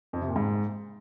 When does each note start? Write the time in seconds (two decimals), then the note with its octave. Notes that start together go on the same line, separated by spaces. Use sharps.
0.13 F2
0.21 C3
0.28 A#2
0.36 G#2